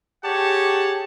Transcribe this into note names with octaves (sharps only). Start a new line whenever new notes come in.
G4 G#4 C#5 F#5 A5